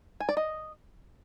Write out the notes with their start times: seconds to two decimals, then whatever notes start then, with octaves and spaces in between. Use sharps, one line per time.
0.20 G#5
0.29 D5
0.37 D#5